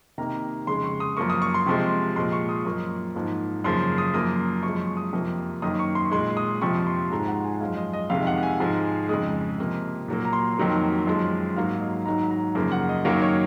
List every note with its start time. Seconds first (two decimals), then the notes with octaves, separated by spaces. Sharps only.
0.18 C3 D#3 A#3 A#5
0.67 F2 C#3 G#3 C6
0.84 C#6
1.00 D#6
1.17 F#2 F3 A#3 C#6
1.30 D#6
1.42 C#6
1.54 C6
1.66 C3 F3 G#3
2.16 A#2 F3 G#3 C6
2.32 C#6
2.49 D#6
2.65 F#2 F3 A#3 C#6
3.15 G#2 F3 A#3
3.64 F#2 C#3 F3 A#3 C6
3.98 D#6
4.14 F#2 F3 A#3 D#6
4.63 F#2 F3 G#3 C#6
4.80 C#6
4.97 D#6
5.13 F2 C3 F3 A#3
5.62 F#2 D#3 A#3 D#6
5.79 C#6
5.95 C6
6.11 A#2 G#3 C6
6.37 D#6
6.62 F2 C3 F3 C#6
6.87 C6
7.10 G#2 F3 G#3 A#5
7.27 F#5
7.44 G#5
7.61 F#2 F3 G#3 F5
7.77 D#5
7.93 D#5
8.10 F2 C3 D#3 G#3 F5
8.27 F#5
8.38 F#5
8.43 G#5
8.60 G#2 F3 G#3
9.09 F2 C#3 G#3 D#6
9.58 C3 F3 A#3
10.08 A#2 F#3 A#3
10.25 A#5
10.33 C6
10.58 F2 D#3 F#3 A#3
11.07 F#2 F3 G#3
11.56 G#2 F#3 A#3 F5
11.81 D#5
12.06 G#2 D#3 F#3 A#5
12.31 A#5
12.55 F#2 C#3 F3 A#3
12.72 F#5
12.89 D#5
13.05 F#2 D#3 F#3 A#3 F5
13.22 C#5